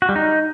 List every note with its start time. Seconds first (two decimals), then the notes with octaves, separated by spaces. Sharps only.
0.02 F#4
0.09 G3
0.16 D#4